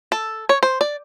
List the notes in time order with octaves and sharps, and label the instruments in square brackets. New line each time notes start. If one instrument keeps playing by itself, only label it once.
[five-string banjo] A4
C#5
C5
D5